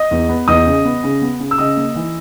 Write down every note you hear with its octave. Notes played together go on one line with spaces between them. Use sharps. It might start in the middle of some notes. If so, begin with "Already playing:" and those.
Already playing: D#5 D#6
E2
B3
E2 D#5 D#6
C#3
B3
C#3
B3
C#3
E6
C#3 D#5 D#6
A#3
E3